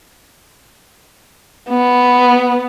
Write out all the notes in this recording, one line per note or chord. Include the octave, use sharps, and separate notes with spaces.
B3